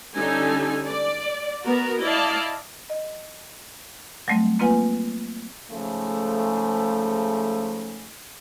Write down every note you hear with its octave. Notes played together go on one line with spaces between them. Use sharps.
D3 G3 C#4 D#4 A4 G#5
D5
B3 F#4 A#4
E4 D5 D#5 F5 A5
D#5
F#3 G3 A3 C4
A#3 C4 F4 B4 F#5 G#5
G#2 C#3 F3 A3